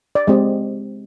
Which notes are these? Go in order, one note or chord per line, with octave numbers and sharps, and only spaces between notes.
D5
G#3 C4 G4 D#5